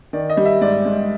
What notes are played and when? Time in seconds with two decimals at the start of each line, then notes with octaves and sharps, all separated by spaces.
0.13 D#3 D5
0.30 D#5
0.37 G3
0.45 E5
0.61 G#2 D5
0.86 G#2